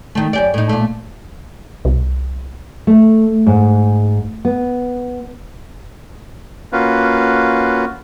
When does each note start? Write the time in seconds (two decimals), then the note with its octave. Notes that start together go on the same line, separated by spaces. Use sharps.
0.15 D#3 A3
0.33 F#2 G4 D5
0.54 A2 D#4
0.69 A#2 A3
1.85 C2
2.87 A3
3.47 G#2
4.45 B3
6.73 A#3 C#4 F4 F#4 B4